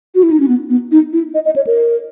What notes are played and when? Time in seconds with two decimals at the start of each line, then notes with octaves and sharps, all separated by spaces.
0.15 F#4
0.23 E4
0.31 D#4
0.40 C#4
0.48 B3
0.70 B3
0.92 D#4
1.13 E4
1.34 D#5
1.45 D#5
1.56 C#5
1.67 A#4